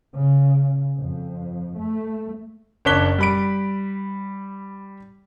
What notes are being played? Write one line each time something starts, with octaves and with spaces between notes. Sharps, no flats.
C#3
F2
A3
F#1 D4 C#5 F#6 B6 G7
G3 B5 D7